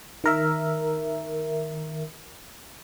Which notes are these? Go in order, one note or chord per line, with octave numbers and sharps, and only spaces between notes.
D#3 A#4 E5